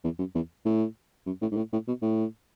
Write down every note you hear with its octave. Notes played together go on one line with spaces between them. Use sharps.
E2
F#2
E2
A2
F#2
A2
G#2
A2
A2
B2
A2